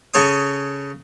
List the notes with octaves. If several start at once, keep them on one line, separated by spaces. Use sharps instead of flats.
C#3 A4 C#5 G#5 D#6